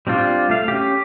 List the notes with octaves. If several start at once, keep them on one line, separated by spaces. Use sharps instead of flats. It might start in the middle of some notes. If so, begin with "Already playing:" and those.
G3 C4 D4 F4 G4
A3 F5
C#4 G4